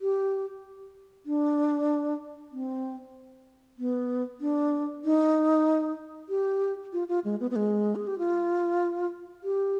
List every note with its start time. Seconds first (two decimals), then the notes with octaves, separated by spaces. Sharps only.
0.01 G4
1.26 D4
2.52 C4
3.78 B3
4.41 D4
5.04 D#4
6.29 G4
6.93 F4
7.09 F4
7.25 G#3
7.40 B3
7.51 B3
7.56 G#3
7.95 G#4
8.07 G4
8.18 F4
9.44 G4